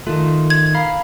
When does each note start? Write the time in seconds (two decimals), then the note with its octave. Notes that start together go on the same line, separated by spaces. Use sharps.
0.07 D#3 A3 F4
0.50 G#6
0.74 F5 A#5 B5